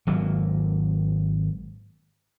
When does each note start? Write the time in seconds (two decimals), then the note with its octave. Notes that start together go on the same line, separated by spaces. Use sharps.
0.07 G#1 F#3 A#3